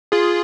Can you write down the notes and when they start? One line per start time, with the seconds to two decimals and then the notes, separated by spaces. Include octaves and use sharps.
0.12 F4 G#4